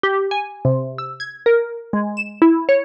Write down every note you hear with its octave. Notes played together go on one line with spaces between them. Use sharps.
G4
G#5
C3
E6
G#6
A#4
G#3
E7
E4
C#5